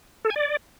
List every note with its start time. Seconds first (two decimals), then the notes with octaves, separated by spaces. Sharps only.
0.25 A4
0.30 G#5
0.36 D5